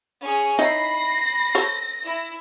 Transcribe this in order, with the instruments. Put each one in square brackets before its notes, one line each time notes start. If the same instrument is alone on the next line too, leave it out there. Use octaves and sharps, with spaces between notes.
[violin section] C#4 G#4 C#5
[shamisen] D#4 E4 C#5 [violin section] B5 C7 [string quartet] A#6
[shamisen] A4 C5 C#5
[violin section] E4